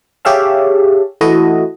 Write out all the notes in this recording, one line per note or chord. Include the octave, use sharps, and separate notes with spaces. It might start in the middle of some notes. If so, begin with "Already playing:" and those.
G4 G#4 C#5 E5 F5 A5
E3 A3 E4 F#4 A4 D#5